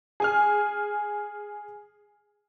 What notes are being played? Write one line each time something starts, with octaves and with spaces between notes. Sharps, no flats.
G#4 G#5 F6